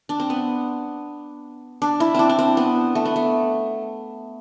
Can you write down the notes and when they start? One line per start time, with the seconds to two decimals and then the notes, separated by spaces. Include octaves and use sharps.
0.09 D4
0.20 C4
0.30 B3
1.82 D4
2.00 E4
2.15 C4 D4
2.29 D4
2.39 C4
2.57 B3
2.95 A3
3.05 B3
3.16 A3